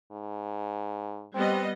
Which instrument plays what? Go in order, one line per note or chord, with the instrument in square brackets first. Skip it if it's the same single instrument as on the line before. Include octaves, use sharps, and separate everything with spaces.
[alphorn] G#2
[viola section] G3 B3 D#5 [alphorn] C4